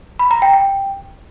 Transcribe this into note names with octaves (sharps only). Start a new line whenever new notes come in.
B5
A#5
G5
G5